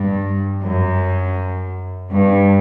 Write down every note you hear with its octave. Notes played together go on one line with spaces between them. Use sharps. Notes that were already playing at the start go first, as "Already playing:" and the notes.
Already playing: G2
F#2
G2